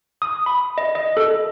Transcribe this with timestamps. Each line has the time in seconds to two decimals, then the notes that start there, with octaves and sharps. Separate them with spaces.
0.22 D#6
0.46 B5
0.78 D#5
0.95 D#5
1.17 A4